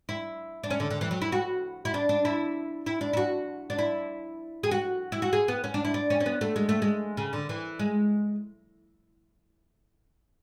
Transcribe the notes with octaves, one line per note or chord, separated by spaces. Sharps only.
E4
D4
C#4
D3
D3
E3
F#3
E4
F#4
E4
D4
D4
E4
E4
D4
E4
F#4
D4
E4
G#4
F#4
E4
F#4
G#4
B3
C#4
D4
E4
D4
C#4
C#4
B3
A3
G#3
A3
G#3
C#3
D3
E3
G#3